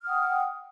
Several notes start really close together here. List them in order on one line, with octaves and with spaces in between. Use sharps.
F6 D#6 F#5 G5